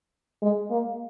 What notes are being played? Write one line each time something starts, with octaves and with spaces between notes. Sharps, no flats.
G#3
A#3